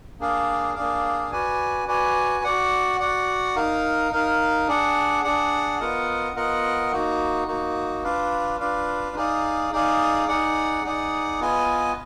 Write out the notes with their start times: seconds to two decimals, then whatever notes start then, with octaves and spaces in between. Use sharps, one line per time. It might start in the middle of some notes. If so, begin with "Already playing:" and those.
0.19 A#3 D4 G#4 D5 F5
0.75 A#3 D4 G#4 D5 F5
1.32 F#4 B4 D5 G#5
1.87 F#4 B4 D5 G#5
2.44 F#4 D5 F#5
2.99 F#4 D5 F#5
3.55 D#4 A#4 F5
4.12 D#4 A#4 F5
4.67 D4 G#4 D5 F#5
5.24 D4 G#4 D5 F#5
5.80 B3 F4 A#4 D#5 F#5
6.35 B3 F4 A#4 D#5 F#5
6.92 A#3 D#4 F#4
7.48 A#3 D#4 F#4
8.04 D4 F4 B4 D5 F5
8.60 D4 F4 B4 D5 F5
9.16 D#4 G#4 D5 F5
9.72 D#4 G#4 D5 F5
10.28 D#4 G#4 D5 F#5
10.84 D#4 G#4 D5 F#5
11.40 B3 F4 B4 D#5 G#5